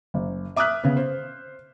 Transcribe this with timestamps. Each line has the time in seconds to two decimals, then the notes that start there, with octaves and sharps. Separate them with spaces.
0.14 F#1
0.56 E5 D6 D#6 F6 F#6 B6
0.84 C#3 B3
0.97 C5